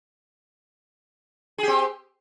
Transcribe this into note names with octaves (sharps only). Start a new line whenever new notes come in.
C4 G4 G#4